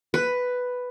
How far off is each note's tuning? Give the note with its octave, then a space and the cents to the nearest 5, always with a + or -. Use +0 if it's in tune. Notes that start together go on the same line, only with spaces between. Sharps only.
B4 +5